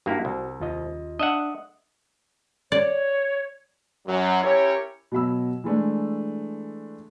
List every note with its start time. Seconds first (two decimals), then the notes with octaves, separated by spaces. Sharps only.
0.06 G2 A#3 E4 F#4
0.25 C2
0.60 D#2 F4 D#5
1.19 D4 D#5 E5 F#5
2.72 C#5 D5
4.07 F#2 F#3
4.42 C#4 E4 G4 A#4 C#5
5.12 B2 F#3 B5 E6
5.64 E3 G#3 A3 D4